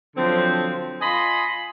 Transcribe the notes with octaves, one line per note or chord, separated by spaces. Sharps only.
D3 F3 F#3 C4
F4 D#5 G#5 B5 C6